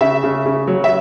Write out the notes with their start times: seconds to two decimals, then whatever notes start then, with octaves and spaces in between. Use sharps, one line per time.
0.01 C#3 E5
0.24 C#3
0.45 C#3
0.67 F#3
0.84 E5